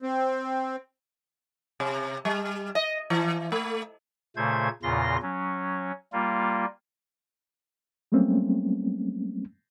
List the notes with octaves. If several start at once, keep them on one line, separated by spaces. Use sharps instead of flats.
C4
C3
G3
D#5
E3
A3
A#2 C#3 A3 C5 G#6
E2 A#2 C#3 F4 C6 A#6
F#3 C#4
G3 A#3 F4
F#3 G3 A3 A#3 C4 C#4